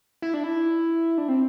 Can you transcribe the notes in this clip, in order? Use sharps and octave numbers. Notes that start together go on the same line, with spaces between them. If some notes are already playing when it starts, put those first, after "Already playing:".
E4
D4
E4
D4
C4